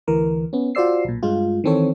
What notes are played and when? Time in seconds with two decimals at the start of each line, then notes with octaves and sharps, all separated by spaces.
0.08 D2 E3 A#4
0.53 B3 C#4
0.75 F4 F#4 C5 D5 E6 C7
1.05 B1 A#2
1.23 G2 G#3 F4
1.64 D#3 E3 C4 A4 C#5